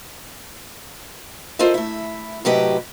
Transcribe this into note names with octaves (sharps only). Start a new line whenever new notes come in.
E4 F4 A4 A#4 C5 D#5
A3 E4
A2 C3 F#3 G4 B4 D#5